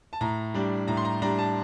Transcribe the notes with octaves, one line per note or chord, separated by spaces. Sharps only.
A5
A2 A#5
G3 D4
A2 A#5
C6
A#5
G3 D4 A#5
A5